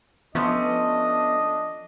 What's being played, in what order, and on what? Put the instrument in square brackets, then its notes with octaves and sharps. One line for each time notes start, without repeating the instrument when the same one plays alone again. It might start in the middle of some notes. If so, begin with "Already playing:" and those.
[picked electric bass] F3 [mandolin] A3 C#4 C6 [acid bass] B3 [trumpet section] D4 D#5